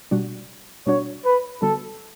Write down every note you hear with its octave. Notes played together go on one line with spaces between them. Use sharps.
B2 G3 D4 F#4
B2 G3 D4 F#4 C#5
B4
D3 G3 B3 F#4 A4